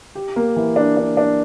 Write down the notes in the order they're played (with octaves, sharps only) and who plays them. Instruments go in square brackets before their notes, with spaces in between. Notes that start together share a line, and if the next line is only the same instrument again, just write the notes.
[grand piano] G4
A#3
E3
D4
D4
D4